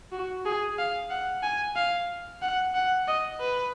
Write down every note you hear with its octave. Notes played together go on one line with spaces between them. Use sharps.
F#4
G#4
F5
F#5
G#5
F5
F#5
F#5
D#5
B4